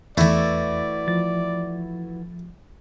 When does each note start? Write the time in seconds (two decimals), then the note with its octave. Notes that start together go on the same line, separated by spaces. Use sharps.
0.17 E2 E3 A3 E4 F#4 D5
1.08 F3 A6